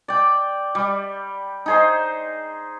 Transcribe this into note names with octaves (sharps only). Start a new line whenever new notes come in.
D5 G5
G3
D#4 G#4 C5